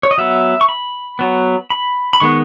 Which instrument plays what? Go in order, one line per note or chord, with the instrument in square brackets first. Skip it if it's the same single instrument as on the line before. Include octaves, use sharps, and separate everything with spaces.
[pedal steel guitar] C#5
D#5
F#3 B3 E5
C#6
B5
F#3 B3
B5
B5
D#3 G#3 B3 C#6